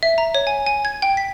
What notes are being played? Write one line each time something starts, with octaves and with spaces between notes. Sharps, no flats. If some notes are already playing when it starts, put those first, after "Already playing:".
E5
A#5
C#5
G#5
G#5
G#6
G5
B6